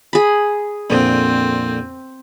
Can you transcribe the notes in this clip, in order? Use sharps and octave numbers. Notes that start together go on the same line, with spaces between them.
G#4 B5
F2 A#2 D3 C4